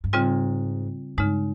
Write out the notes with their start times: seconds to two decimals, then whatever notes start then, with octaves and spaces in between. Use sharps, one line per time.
0.04 G2
0.13 G#2 C#3 G3 C4 F4
1.17 G2 C#3 G#3 D#4